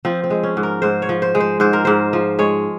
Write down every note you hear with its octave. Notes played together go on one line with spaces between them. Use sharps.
F3 C4
C4
G#3
C#4
G#2
A#4
G#2 C5
C#5
F3
C5
G#3
C5
G#2 C5
A#4
G#2 C5
F3
G#3 C#5